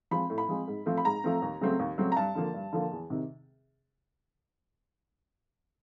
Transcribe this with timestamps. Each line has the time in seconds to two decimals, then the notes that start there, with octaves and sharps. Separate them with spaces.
0.11 F3 G#3 C4 B5
0.30 A2
0.38 B5
0.49 F3 G#3 C4
0.68 G#2
0.86 F3 A3 C4
0.98 B5
1.05 G#2 A#5
1.24 F3 A3 C4
1.42 D#2
1.61 C#3 F#3 A3 C4
1.79 D#2
1.98 C#3 F#3 A3 C4
2.12 A#5
2.16 G2 A5
2.35 D3 F3 A#3
2.54 G2
2.73 D3 F3 A#3
2.92 E2
3.10 C3 D#3